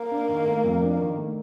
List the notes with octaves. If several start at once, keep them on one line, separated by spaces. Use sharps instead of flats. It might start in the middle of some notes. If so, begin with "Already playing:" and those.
Already playing: A#3
D4
D#3
A3
F2
D4
D#3
A3